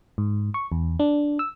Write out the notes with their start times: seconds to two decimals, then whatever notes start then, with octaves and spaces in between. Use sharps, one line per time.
0.18 G#2
0.54 C#6
0.72 E2
1.00 D4
1.39 E6